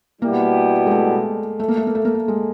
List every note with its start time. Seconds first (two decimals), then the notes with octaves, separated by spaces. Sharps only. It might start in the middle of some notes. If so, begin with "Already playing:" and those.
0.22 B2 G3 A#3 B3 E4 G4
0.86 G#3
0.91 A3
1.60 A3
1.68 A#3
1.77 A3
1.87 A#3
1.95 A3
2.05 A#3
2.14 A3
2.28 G#3